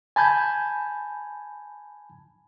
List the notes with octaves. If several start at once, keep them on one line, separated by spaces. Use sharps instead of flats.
G#5 A5 B5 G6 G#6